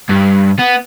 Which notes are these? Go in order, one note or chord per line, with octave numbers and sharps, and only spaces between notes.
G2
B3